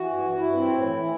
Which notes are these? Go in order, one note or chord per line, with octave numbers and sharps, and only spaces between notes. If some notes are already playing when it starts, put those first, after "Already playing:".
Already playing: E3 F#4
G2
G2
G2 E4
C4
A2
E3
E3